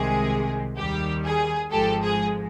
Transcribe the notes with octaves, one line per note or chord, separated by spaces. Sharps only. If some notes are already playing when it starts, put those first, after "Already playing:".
Already playing: C2 C3 D#3 G#3 G#4
D#2 D#3 G3 G4
G#4
G#1 G#2 F3 G#3 G4 A4
G#4